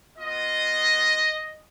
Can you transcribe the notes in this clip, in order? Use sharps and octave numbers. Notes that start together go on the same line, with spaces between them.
B3 F4 D#5